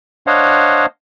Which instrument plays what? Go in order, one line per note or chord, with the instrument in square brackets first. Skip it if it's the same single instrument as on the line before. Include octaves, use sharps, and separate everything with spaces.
[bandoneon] D4 C5 C#5 D#5 F5 F#5